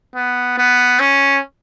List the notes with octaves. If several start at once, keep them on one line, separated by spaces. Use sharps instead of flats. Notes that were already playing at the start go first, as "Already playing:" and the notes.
B3
B3
C#4